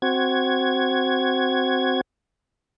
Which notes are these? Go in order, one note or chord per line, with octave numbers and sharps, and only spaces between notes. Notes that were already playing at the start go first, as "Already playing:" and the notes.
C4 F#4 G#6